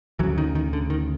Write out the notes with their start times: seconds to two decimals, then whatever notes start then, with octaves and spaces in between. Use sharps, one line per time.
0.19 D2 E3 F#3
0.23 C#3
0.38 D#3
0.55 D#3
0.73 D3
0.90 D#3